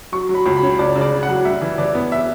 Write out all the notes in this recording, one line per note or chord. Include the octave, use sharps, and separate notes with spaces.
F#3 C#6
F#3
B5
C#2
B5
C#4
C#2 D5
C#3
D5
C#3
F#5
F#3
G2 E5
E3
E3 D5
B3
E5